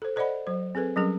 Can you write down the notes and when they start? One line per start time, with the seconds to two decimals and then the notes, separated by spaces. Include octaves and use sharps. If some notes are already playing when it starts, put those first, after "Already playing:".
0.02 A4 C5
0.16 A4 C5 D5 D#5 F#5 B5
0.47 F#3 C5
0.75 C4 G#4 A4 B4
0.96 F#3 G3 C#4 G#4 A#4